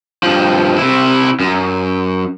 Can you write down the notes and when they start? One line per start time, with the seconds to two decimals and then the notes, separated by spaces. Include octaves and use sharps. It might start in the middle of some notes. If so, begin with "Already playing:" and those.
0.23 G2 F3
0.78 C3 E4
1.40 F#2